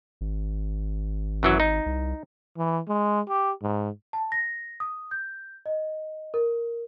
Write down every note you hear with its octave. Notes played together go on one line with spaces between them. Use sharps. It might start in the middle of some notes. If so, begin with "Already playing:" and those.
G#1
F#2 E3 F#3
D#4
C2
E3
G#3
G4
G#2
A5
A#6
D#6
G6
D#5
A#4